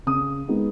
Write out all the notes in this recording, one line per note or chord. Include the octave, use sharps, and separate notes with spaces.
C#3 D#6
G#3 B3 D#4